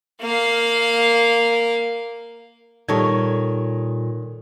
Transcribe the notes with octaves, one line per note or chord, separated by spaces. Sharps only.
A#3 F5
A#2 D#3 G3 A4 C#5 G#6